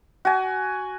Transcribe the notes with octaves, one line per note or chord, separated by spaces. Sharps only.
F#4 G#5